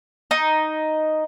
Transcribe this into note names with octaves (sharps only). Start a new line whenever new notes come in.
D#4